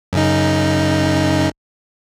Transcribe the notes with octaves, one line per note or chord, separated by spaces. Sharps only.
F#2 C#3 D#4